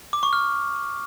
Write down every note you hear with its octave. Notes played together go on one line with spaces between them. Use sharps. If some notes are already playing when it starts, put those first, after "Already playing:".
D6
C#6
F6